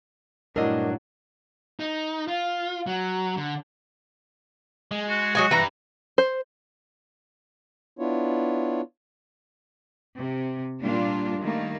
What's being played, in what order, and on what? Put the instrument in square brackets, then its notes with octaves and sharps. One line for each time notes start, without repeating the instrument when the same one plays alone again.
[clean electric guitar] G2 D4 [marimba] A#2 A3 E4 [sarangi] F#3 [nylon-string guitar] A#4 D#5
[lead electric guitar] D#4
F4
F#3
D3
[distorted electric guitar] G#3
[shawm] F#4
[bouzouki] F#3 D#5 G#5 [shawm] F#4
[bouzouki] E3 A#5 [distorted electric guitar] G3 B4
[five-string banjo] C5
[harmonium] B3 D4 E4 F4 C#5
[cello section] C3
A#2 G3 A#3 D4 F4
D#3 G3 A3 A#3